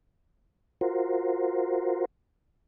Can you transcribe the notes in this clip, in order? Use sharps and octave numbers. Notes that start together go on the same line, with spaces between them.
F4 F#4 A#4 C5